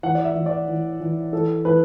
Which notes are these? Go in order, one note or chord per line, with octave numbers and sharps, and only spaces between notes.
E3 F#5
D5
E5
E3
D5
E3
E3
E3 A4
E3 B4